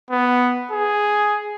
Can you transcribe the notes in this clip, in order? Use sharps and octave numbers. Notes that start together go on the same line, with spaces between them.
B3
G#4